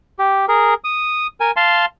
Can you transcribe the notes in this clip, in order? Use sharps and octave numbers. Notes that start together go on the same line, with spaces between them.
G4
G#4 A#4
D#6
A#4 G#5
F5 A5 C6